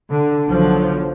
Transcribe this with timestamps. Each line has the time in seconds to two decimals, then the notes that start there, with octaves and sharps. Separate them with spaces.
0.10 D3
0.47 B1 D3 F3 F#3